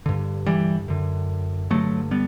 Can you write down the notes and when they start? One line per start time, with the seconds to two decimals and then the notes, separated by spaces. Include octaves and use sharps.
0.06 G2 D3
0.46 E3 G3
0.88 F#2 D3
1.70 G2 D3 F#3 A3
2.11 G3 B3